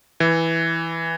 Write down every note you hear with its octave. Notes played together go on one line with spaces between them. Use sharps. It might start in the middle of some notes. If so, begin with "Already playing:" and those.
E3